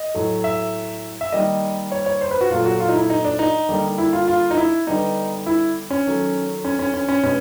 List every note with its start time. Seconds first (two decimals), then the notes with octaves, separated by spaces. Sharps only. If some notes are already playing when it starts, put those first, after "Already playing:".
Already playing: D#5
0.14 A2 F#3 A3
0.44 E5
1.21 E5
1.32 D#3 G3 A#3 D#5
1.92 C#5
2.06 C#5
2.21 C5
2.31 B4
2.41 F#4
2.50 A#2 F#3 A3 F4
2.65 F#4
2.80 F4
2.88 D#4
2.96 E4
3.10 D#4
3.25 D4
3.39 D#4
3.69 D3 G3 A#3
3.98 E4
4.13 F4
4.28 F4
4.51 D#4
4.57 E4
4.87 D3 G3 B3 D#4
5.46 E4
5.90 C#4
6.05 D#3 F#3 A3
6.65 C#4
6.79 C#4
6.94 C#4
7.09 C#4
7.23 B2 G#3 B3 C#4